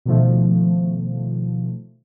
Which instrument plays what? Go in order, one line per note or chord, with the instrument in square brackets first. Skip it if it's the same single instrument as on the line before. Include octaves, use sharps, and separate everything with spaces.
[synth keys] B2 D#3 F3 A3